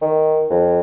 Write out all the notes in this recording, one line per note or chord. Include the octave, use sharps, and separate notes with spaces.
D#3
F2